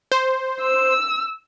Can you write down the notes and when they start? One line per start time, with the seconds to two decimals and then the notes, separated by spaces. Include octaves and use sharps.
0.12 C5
0.61 E6